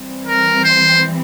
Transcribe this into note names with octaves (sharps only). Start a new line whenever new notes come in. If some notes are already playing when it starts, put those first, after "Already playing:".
Already playing: E3 G3 C4
A#4
C5